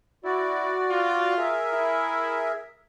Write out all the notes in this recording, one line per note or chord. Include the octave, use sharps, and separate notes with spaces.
E4 F#4 D5
F4
G#4 A#4 E5
E4